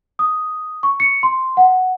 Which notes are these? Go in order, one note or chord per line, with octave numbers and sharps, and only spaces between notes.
D#6
C#6
C#7
C6
F#5